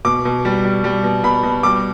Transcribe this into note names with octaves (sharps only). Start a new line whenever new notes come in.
B2 D6
B2
G3
G3
G3
B2
B2 B5
B2
G3 D6